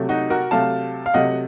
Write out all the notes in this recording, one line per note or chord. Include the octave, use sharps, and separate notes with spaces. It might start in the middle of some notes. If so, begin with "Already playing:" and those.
Already playing: C3 F#3 A3
D#4 F#4
F#4 A#4
C3 F#3 A3 F5 A5
F5
C3 F#3 A3 D#5 F#5